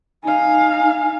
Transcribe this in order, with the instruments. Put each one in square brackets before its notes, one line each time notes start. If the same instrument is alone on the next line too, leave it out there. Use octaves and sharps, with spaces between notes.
[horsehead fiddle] D#4 F5 [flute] G#5